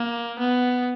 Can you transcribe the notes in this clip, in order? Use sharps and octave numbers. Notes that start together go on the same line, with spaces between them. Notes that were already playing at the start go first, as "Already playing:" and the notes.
Already playing: A#3
B3